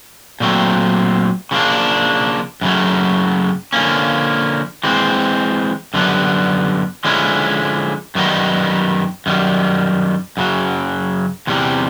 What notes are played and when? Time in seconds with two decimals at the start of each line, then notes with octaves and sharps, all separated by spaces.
0.40 A#2 F#3 A3 C4
1.51 C#3 F3 A#3 D4
2.61 F#2 C#3 F#3 A3
3.73 D3 F3 A#3 C#4
4.84 E3 G#3 C4
5.94 F#2 D3 G3 B3
7.04 D3 F3 G#3 C#4 E4
8.15 F#2 D#3 G3 B3 D#4
9.26 F#2 D#3 G3
10.37 F#2 C#3 F#3
11.47 E2 C3 G3